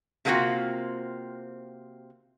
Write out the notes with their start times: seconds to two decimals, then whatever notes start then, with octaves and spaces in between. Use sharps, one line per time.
0.25 C3 G#3 A#3 C4 F4 F#4